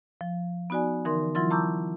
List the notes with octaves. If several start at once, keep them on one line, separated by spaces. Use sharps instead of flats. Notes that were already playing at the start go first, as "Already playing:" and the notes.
F3
B3 D#4 F#4 D5 G#5
D3 E3 D#4 A#4 C6
E3 F#3 E4 F4 C6 A6
A5 A#5 C#6 D6 E6 G6